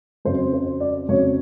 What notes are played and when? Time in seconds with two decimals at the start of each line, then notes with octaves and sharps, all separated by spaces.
0.25 F2 C#3 F#3 C5
0.53 C5
0.80 D5
1.09 F2 C#3 F#3 C#5